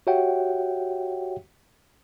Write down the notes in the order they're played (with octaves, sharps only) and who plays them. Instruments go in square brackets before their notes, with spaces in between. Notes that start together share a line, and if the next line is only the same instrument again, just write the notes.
[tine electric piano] F#4 G4 C#5 E5 F#5 G5